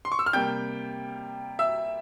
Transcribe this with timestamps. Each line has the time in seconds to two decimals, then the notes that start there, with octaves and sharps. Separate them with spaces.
0.05 C6
0.12 C#6
0.19 E6
0.26 F6
0.33 C3 G3 A#3 G5 G6
1.59 E5 E6